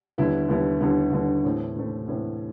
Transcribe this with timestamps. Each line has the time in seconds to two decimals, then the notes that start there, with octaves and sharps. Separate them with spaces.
0.18 D#2 D3 G3 B3 E4
0.49 D#2 D3 G3 B3 E4
0.81 D#2 D3 G3 B3 E4
1.12 D#2 D3 G3 B3 E4
1.44 A2 E3 A3 C4
1.76 A2 E3 A3 C4
2.08 A2 E3 A3 C4